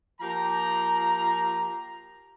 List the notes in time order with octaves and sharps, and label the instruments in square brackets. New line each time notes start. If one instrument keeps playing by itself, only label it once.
[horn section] F3 A#3 G4 A#5